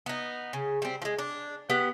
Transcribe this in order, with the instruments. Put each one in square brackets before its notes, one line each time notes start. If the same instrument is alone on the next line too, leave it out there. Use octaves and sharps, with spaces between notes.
[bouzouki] B3 D#4
C#3
G3 C4
F3 G#3
D4
B3 G4 F#5